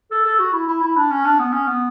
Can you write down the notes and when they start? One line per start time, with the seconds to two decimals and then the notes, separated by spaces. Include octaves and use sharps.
0.11 A4
0.25 A4
0.39 F#4
0.53 E4
0.67 E4
0.82 E4
0.96 D4
1.11 C#4
1.25 D4
1.39 B3
1.53 C#4
1.67 B3